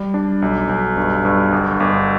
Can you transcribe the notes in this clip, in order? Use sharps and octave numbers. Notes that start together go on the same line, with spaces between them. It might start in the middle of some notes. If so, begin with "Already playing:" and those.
Already playing: G3
D4
B1
B1
G2
G2
G1
G1